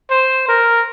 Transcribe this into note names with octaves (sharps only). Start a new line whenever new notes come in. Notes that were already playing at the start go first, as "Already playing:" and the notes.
C5
A#4